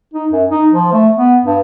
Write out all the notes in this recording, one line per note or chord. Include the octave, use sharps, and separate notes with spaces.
D#4
F#2
D#4
F3
A3
B3
G2